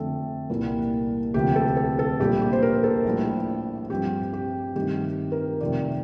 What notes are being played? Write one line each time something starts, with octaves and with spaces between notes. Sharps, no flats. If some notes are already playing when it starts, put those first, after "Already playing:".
Already playing: F2 D3 A3 C4 A4
C2 A#2 G3 A#3
D2 C3 F3 C4 G4
A4
A4
A4
A#1 A#2 G3 G4
G4
C5
A#4
A4
A#1 A2 G3
G2 F3 C4 G4
G4
G2 D#3 A3 C4 G4
A#4
F2 C3 D#3 A3 C4 D5